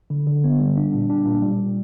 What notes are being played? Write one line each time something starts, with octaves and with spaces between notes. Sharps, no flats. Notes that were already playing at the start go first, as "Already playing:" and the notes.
D3
D3
B3
G3
D4
A#2
D4
A#2
G3